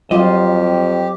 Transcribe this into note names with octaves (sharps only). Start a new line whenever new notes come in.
F2 F#3 G3 F4 G4 D#5